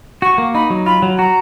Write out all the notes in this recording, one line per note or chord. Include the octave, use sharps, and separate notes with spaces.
F#4 C#6
A#3
D#4 B5
F#3
F4 B5
F#3
F#4 A#5